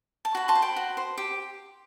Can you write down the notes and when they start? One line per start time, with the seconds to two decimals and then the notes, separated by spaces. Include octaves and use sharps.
0.25 A5
0.35 F#4 B5
0.48 A5 C6
0.55 C5
0.62 G5 B5
0.76 F#4
0.97 C5
1.18 G4